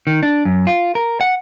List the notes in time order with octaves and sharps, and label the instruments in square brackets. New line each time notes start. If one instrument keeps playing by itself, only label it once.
[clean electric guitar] D#3
D4
F#2
F4
A#4
F#5